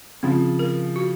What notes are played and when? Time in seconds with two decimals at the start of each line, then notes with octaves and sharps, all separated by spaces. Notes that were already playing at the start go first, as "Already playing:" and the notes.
0.23 C#3 F3 C4
0.59 A#4
0.96 F#4